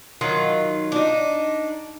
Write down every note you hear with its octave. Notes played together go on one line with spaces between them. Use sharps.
D#3 F#3 F4
D4 D#4